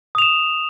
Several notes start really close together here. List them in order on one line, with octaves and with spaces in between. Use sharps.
D#6 F7 E7